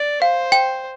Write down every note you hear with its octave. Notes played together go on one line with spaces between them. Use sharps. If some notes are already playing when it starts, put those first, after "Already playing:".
Already playing: D5
C5 F5
G5